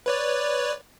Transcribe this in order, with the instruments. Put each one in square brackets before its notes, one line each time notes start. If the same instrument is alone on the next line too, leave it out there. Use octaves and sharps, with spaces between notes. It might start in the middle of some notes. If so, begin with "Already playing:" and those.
[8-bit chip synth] B4 C#5 D5